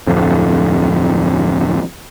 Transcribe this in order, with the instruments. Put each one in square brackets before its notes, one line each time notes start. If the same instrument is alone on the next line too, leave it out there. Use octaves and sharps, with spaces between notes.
[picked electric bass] D1 F2